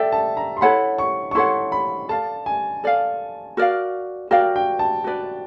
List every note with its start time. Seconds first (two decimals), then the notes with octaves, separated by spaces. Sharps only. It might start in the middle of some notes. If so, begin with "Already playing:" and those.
Already playing: A4 D5 E5 G5
0.12 A5
0.37 A#5
0.57 C6
0.61 E4 A4 C#5 F#5 B5
0.98 C#6
1.31 C#6
1.35 E4 A4 C#5 F#5 C6
1.72 B5
2.09 A4 D5 F5 A5
2.46 G#5
2.84 A4 D5 F5
3.57 F#4 A#4 D5 F5
4.31 F#4 A#4 D5 F5 G5
4.56 G5
4.79 A5
5.04 F#4 B4 D5